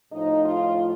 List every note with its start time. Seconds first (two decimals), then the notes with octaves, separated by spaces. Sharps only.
0.12 A2 F3 D#4
0.45 F4